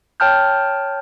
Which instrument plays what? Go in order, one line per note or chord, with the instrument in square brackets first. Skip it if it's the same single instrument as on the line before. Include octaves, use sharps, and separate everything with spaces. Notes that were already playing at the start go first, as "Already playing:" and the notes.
[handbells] C#5 G5 A5 F6 G6